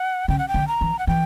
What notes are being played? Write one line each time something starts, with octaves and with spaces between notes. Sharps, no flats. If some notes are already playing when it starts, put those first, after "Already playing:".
Already playing: F#5
C#3 G5
F#5
G5
D3
A#5
E3
F#5
E3 G5